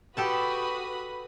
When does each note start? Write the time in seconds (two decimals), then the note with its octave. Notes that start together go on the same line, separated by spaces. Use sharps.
0.17 F#4 G4 A4 B4 A5 B5 D#6